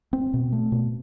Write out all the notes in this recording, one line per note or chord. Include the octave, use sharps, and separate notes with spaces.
C4
B2
A3
B2